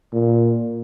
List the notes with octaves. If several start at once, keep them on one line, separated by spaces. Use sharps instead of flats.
A#2